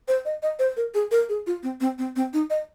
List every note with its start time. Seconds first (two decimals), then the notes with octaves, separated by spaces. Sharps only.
0.08 C5
0.25 D#5
0.43 D#5
0.59 C5
0.77 A#4
0.94 G#4
1.11 A#4
1.29 G#4
1.47 F4
1.63 C4
1.81 C4
1.98 C4
2.16 C4
2.33 D#4
2.50 D#5